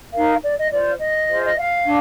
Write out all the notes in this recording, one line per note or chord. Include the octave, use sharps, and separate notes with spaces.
D#4 A#4 F5
D5
D#5
F4 C5 D5
D#5
F4 G#4 C5
D#5
F5
D4